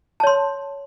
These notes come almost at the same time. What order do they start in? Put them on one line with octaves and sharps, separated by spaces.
A5 C#5 C6